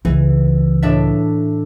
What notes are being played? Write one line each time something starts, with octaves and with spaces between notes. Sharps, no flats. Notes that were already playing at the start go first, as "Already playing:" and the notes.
C#2 E3
A2 D4 E5